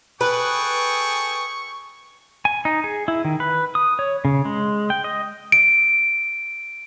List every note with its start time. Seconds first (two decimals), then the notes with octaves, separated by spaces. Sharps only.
0.21 G#4 A4 B4 G5 C#6
2.45 G#5
2.65 D#4
2.84 G#4
3.08 E4
3.25 D#3
3.40 B4
3.75 D#6
3.99 C#5
4.25 C#3
4.45 G#3
4.90 G5
5.04 D#5
5.52 D7